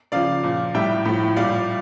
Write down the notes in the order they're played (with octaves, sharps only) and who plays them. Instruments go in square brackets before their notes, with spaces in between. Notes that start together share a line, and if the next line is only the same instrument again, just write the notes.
[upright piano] C#3 F3 D5 F5
A#2 F3
A2 G3 E5 G5
A2 F3
A#2 G3 D5 F5